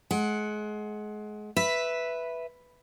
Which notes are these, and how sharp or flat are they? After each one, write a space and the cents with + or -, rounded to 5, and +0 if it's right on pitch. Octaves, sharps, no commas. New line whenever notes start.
G#3 +30 F#5 +0
B4 +0 E5 +0